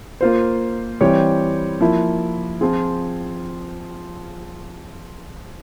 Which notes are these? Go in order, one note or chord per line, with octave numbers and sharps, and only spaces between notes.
A#3 F4 C5
E3 G3 C4 G4 C#5
F3 A#3 E4
F3 C4 F4 G#4